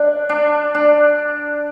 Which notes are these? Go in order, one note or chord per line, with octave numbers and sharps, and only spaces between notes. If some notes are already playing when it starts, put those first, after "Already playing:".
Already playing: D4
D4
D4